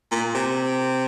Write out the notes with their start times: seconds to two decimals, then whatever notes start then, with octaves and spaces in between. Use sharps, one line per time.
0.11 A#2
0.35 C3